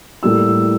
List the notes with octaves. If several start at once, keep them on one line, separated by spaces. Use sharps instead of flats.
A2 G3 A#3 E4 E6